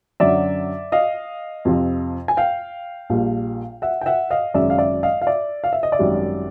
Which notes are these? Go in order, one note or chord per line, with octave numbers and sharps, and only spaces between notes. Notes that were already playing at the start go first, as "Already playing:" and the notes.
F#2 D3 F#3 D5 E5
D#5 F5
F2 C3 F3
G#5
F5 G5
A#1 A#2 G3
E5 F#5
G5
E5 F#5
D#5 F5
G#1 F#2 C#3 D5 E5
F5
D5 E5
D#5 F5
F5
D5 E5
F5
E5
D#5
D5 E5
G#1 F#2 D#3 G3